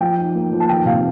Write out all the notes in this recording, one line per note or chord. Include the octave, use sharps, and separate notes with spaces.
F3 G5
D#4
A#3
F3
A5
D#3 G5
C3 F5